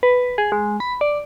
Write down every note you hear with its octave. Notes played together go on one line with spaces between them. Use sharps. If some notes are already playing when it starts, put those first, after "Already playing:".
B4
G#4
G#3
B5
D5